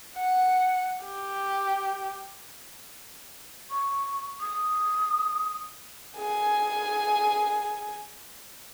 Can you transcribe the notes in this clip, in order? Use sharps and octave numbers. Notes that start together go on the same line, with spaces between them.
F#5
G4
C#6
D#6
G#4 G#5